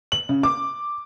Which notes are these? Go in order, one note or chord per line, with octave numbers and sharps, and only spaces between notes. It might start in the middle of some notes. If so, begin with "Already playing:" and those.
F#7
C#3
D6